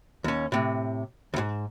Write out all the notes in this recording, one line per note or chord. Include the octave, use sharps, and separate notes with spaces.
D#2 C#4
A2 C3
D2 G#2